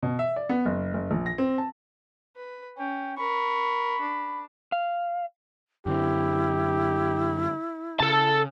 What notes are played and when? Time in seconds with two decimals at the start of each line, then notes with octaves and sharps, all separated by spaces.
0.03 B2
0.19 E5
0.36 D5
0.49 B3
0.65 F#1
0.94 F#1
1.11 A#1
1.26 A#6
1.38 C4
1.58 A5
2.36 B4
2.78 C#4 G5
3.17 A#4 B5 C#6
4.01 D4
4.72 F5
5.86 F#2 D3 C4 E4 G4
8.00 C#3 A4 A5